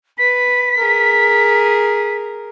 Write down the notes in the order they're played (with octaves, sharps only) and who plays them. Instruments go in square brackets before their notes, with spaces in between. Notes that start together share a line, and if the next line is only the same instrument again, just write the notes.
[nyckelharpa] B4 [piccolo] B6
[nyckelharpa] G#4 A#4